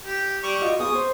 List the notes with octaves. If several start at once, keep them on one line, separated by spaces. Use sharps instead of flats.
G4
G3 C#6 D6
F4 F#4 D#5
B3 G#4 C#6 D#6
C5